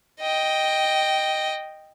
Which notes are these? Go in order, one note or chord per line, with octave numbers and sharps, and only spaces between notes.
D#5 G5